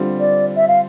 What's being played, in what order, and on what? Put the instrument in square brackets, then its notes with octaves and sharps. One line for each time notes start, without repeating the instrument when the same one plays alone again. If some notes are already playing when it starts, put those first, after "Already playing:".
Already playing: [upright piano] D3 G3 C4 F4
[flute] D5
E5
F5